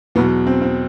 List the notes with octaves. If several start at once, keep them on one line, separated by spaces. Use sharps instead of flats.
E2 B2 F#3 B3
C4
C4